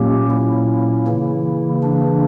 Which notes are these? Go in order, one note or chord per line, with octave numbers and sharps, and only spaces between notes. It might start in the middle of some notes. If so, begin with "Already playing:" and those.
Already playing: A#2 F#3 A#3 C#4 G4
E4
C#3 E3 A#3
D4